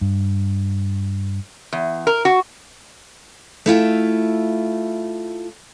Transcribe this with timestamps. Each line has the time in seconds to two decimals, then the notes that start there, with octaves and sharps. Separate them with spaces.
0.01 G2
1.73 E2
2.07 A#4
2.25 F#4
3.66 A3 E4 F4 G5